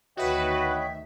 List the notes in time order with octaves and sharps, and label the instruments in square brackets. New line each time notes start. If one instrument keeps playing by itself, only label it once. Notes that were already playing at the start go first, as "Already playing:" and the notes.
[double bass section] D2 D#3 [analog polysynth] F#4 B4 [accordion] C#5 D#5 G5 [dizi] E5